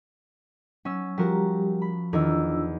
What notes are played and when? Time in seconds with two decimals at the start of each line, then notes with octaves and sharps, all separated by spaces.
0.85 F#3 C#4 E6
1.18 F3 G3 F#4 G4 A#4
1.82 B5
2.13 E2 D#3 D4 F4 E6